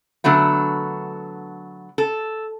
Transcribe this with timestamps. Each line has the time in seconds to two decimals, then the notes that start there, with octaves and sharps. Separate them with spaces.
0.24 D3 F#3 A3 B3
1.98 A4